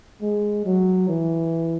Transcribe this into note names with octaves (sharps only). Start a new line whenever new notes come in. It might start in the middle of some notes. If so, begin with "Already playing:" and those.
G#3
F#3
E3